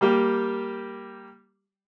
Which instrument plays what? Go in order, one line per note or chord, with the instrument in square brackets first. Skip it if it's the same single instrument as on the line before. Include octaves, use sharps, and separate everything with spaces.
[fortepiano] G3 A#3 G4